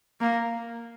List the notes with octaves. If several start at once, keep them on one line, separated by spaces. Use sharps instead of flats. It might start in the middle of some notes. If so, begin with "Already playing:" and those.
A#3